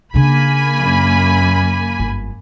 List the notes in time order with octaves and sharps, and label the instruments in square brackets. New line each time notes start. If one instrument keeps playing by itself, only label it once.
[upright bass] C#3 D4 [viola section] A#3 G#5 B5
[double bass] F#2
[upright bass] G1